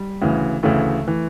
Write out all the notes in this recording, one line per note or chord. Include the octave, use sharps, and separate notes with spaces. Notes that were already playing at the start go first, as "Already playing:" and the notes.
Already playing: G3
D2 C#3 E3
D2 C#3 E3 A3
E3